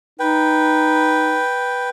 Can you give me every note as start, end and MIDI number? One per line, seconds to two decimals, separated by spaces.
0.19 1.41 63
0.19 1.90 71
0.19 1.90 79